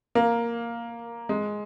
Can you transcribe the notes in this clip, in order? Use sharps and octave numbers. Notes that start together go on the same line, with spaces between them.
A#3
G#3